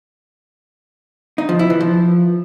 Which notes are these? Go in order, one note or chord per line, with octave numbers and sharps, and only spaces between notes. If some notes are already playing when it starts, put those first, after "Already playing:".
D#4
F3
E4
E3
F3